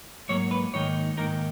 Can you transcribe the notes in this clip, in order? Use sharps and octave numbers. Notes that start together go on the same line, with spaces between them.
G#2 F#3 A#3 C#5
B4
G#2 D#3 A#3 D#4 C#5
G#2 D#3 A#3 D#4 A#4